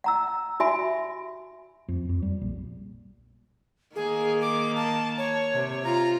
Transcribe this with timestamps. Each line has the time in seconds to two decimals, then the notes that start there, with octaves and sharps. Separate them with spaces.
0.04 F#5 A#5 E6
0.60 F#4 E5 G#5 B5
1.88 F2
2.09 F2
2.22 G3
2.41 A#1
3.96 D#3 A#3 G#4
4.41 D6
4.76 A5
5.18 C#5
5.54 C3
5.84 F4 A#5